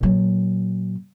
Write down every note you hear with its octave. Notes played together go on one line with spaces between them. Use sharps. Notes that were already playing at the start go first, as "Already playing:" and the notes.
A#2 F#3